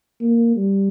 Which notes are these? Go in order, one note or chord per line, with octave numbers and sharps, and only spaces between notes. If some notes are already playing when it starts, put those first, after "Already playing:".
A#3
G3